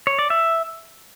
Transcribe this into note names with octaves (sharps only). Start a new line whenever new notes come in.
C#5
D5
E5